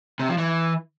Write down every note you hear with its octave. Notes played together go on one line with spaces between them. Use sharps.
C3
F3
E3